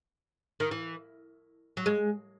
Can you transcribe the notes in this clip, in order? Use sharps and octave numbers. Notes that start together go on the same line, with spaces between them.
D#3
E3
F#3
G#3